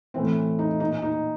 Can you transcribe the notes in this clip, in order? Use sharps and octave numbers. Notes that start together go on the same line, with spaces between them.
A2 E3 C4
D#4
A#2 D#4
D#4